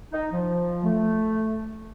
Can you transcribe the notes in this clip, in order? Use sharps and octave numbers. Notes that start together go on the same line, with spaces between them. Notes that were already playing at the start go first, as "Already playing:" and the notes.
D#4
F3
A3